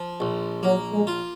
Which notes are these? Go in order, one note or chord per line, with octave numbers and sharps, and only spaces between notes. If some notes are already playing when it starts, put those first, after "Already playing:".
Already playing: F3
A#1
F#3 A#3
G#3
F4